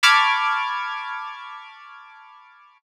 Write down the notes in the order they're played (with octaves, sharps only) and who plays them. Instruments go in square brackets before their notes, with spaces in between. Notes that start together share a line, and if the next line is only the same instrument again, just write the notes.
[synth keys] A5 B5 C#6 D6 F6 G#6